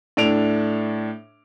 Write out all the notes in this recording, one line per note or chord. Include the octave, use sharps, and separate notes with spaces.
A2 D4 A4 D7 F7